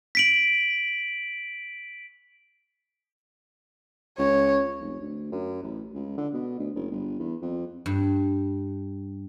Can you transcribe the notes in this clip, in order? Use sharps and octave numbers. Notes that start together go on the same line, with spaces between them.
B6 D7 F#7
C#2 C#5
F1
D2
F#2
A1
C#2
D3
B2
D2
F#1
G1
E2
F2
G2